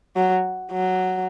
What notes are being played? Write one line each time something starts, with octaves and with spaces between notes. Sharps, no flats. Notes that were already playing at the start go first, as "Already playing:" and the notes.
F#3
F#3